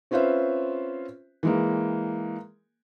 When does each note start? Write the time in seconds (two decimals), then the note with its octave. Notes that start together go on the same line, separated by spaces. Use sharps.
0.11 C4 C#4 F4 B4 C5 E5
1.43 E3 G#3 A#3